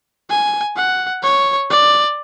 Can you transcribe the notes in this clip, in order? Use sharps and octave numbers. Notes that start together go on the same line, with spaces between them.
G#5
F#5
C#5
D5